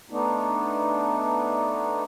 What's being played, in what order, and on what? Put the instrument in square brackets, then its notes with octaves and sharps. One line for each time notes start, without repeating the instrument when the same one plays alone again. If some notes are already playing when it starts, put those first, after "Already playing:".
[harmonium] A3 B3 D4 D#4